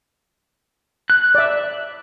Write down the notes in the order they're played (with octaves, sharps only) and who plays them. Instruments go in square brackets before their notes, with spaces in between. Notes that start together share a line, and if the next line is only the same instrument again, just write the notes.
[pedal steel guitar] F#6
[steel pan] D5 E5